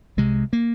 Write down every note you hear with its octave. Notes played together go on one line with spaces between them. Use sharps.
C2 C3 G#3
A#3